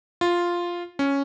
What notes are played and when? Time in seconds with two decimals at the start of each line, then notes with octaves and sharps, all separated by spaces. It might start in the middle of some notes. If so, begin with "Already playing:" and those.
0.21 F4
0.99 C#4